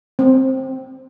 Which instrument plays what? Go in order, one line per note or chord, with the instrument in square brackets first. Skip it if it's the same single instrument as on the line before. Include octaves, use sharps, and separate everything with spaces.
[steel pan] C4